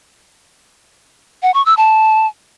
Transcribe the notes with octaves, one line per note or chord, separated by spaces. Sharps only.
F#5
C#6
E6
A5